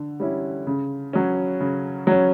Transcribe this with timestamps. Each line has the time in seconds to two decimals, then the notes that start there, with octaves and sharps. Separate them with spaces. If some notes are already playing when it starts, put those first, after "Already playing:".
Already playing: D3
0.20 G3 C#4 E4
0.67 C#3
1.13 F#3 C#4
1.60 C#3
2.07 F#3 C#4